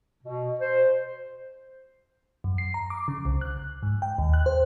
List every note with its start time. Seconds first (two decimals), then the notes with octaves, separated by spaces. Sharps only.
0.23 B2
0.60 C5
2.44 F#2
2.58 C7
2.74 A#5
2.90 D6
3.08 C#3
3.25 C2
3.41 F#6
3.83 G#2
4.02 G5
4.18 D#2
4.34 F#6
4.46 C5